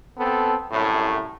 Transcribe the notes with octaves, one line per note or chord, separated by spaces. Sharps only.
B3 C4 A4
C2 F#2 A2